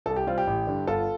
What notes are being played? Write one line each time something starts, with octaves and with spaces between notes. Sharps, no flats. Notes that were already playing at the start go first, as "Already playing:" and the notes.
C2 A4
G4
C3 G3 C4 F4
G4
A1
G2 D3
G1 F4 A4